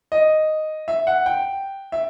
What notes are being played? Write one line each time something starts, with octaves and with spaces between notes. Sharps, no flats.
D#5
E5
F#5
G5
E5